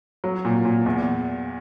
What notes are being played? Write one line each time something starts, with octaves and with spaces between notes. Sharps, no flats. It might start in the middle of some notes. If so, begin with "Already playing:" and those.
F#3
A#2
A#2
E2